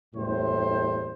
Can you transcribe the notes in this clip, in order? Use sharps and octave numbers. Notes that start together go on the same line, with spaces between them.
F#1 E2 A2 G3 A3 C5